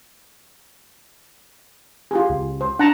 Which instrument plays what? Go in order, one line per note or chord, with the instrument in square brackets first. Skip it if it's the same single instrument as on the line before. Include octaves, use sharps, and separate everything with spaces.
[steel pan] F4 G4 G#4
[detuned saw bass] C#2
[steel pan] C5
[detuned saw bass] D4 [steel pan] F#5 A5 A#5